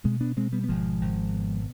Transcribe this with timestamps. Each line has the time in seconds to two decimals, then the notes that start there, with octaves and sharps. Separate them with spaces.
0.04 B2 G#3 C4
0.21 B3 D4
0.36 B2 G#3 C4
0.52 G3 B3
0.64 B3
0.69 G#1 F3 G#3
1.01 G#1
1.33 B2